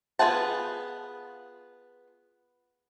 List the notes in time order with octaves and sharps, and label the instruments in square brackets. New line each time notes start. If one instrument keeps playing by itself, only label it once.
[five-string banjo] B3 F4 G#4 F#5 A5